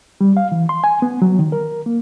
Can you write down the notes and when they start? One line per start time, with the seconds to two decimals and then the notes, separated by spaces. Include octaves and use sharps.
0.21 G3
0.37 F5
0.52 E3
0.69 C6
0.84 G#5
1.02 B3
1.22 F#3
1.39 D#3
1.52 A#4
1.86 A#3